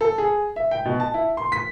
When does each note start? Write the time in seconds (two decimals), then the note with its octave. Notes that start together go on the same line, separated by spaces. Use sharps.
0.01 A4
0.18 G#4
0.56 E5
0.71 G5
0.85 B2
1.00 A5
1.14 E4
1.37 C6
1.52 B6